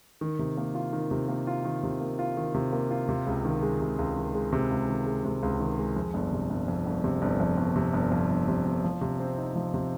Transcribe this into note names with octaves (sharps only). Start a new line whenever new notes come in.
D#3
C3
A#3
F4
D#3
C3
A#3
F4
D#3
C3
A#3
F4
D#3
C3
A#3
F4
C3
C#2
D#3
G#3
C3
C#2
D#3
G#3
C3
C#2
D#3
G#3
C3
C#2
D#3
G#3
F2
G1
C3
G1
F2
G1
C3
G1
F2
G1
C3
G1
F2
G1
C3
G1
F3
C3
C4
D#4
F3
C3